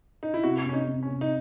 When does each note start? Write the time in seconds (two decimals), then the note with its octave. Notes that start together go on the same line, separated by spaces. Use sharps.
0.23 D#4
0.34 E4
0.43 C3 F#4
0.66 C3 C#4
0.73 D#4
0.88 C3
1.03 C#4
1.10 C3
1.21 D#4